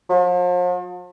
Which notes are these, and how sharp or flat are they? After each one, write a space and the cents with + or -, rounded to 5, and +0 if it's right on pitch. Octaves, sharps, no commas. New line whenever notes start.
F3 +40